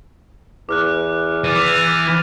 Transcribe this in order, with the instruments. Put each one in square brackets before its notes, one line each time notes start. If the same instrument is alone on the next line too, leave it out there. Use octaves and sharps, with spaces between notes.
[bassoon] E2 [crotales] D6 F6 F#6
[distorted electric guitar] E3 [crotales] D6 A6 D#7 [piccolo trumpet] F6